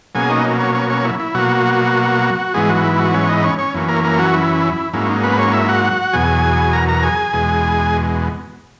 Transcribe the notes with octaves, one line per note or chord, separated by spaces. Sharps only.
B2 F#3 A#3 C#4 G#4 G#5
D#4 D#5
C#4 C#5
C#4 C#5
C#4 C#5
E4
E4
B2 F#3 A#3 F#4
G#2 E3 G#3 B3 G#4
F#3 F#4
E4
F#3 F#4
C#4 C#5
D#4 D#5
C#4 C#5
C#4 C#5
F#2 E3 A#3 C#4
A#3 A#4
A#3 A#4
F#3 F#4
E4
G#2 F#3 A#3 C#4 E4
D#4
B3 B4
C#4 C#5
E4 E5
F#4 F#5
E2 B2 F#3 G#4 G#5
A#4 A#5
A#4 A#5
G#4 G#5
E2 B2 G#3